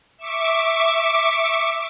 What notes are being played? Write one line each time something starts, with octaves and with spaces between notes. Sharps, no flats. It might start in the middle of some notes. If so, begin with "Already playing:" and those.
E5 C#6 D6